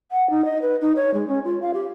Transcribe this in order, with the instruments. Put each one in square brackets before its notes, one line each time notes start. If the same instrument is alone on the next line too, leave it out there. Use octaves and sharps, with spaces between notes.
[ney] F#5
D#4
D#5
B4
D#4
C#5
G#3
C#4
F4
F5
G4